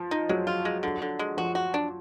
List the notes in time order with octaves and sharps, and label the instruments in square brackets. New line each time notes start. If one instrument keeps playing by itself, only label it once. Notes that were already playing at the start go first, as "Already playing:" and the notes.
Already playing: [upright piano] F3
[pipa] D#4
[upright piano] F#3 [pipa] G#3
[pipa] F4
G#3
D3
D3
G#3
[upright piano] F3 [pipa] F#4
[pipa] F#4
D4